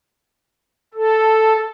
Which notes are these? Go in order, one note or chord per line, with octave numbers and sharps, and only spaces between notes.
A4